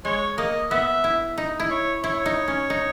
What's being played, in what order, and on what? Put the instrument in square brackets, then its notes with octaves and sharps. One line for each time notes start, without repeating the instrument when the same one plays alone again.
[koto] G#3 [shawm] C#5
[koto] A#3 [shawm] D#5
[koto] B3 [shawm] E5
[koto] E4
D#4
E4
[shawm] C#5
[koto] E4 [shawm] C#5
[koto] D#4
C#4
D#4